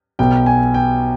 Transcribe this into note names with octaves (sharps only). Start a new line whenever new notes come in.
B1 B2 B3 G5
G#5
G5